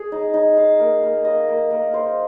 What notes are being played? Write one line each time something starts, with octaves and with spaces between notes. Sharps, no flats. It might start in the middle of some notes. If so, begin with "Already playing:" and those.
Already playing: G#4
D#4
D#4
F5
A#3
A#3
D#5
A#3
A#3
C5